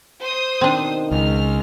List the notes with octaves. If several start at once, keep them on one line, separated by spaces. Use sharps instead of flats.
C5 D#6
B2 D#3 C4 D4 D#4
C#2 F6